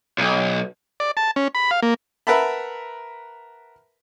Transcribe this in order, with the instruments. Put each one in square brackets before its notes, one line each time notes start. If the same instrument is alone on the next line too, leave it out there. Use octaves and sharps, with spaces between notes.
[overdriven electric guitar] B1
[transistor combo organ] D5
A5
C#4
B5
F5
A#3
[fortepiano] A#4 B4 E5 F#5 A5 B5